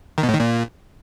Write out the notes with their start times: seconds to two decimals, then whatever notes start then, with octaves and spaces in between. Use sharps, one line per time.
0.18 D#3
0.23 B2
0.29 A2
0.34 D#3
0.40 A#2